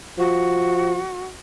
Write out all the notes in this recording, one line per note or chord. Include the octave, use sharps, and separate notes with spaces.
F3 F#4